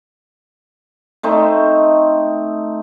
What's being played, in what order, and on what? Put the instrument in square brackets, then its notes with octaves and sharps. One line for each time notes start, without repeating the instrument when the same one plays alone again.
[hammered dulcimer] A3 C4 D#4